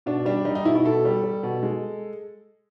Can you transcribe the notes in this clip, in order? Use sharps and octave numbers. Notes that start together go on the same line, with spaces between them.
B2 D4
G3 D4
G3 D#4
D#4
B2 E4
E4
B2 A4
G3
G3
B2
G#3